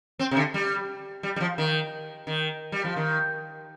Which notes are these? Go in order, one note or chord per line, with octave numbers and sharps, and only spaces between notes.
C4
C3
D3
G3
G3
G3
F3
D#3
D#3
G3
F3
D#3